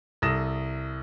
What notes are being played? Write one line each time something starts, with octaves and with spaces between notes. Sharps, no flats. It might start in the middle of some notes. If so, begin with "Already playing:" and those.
C2 A4 D#6 A#6 E7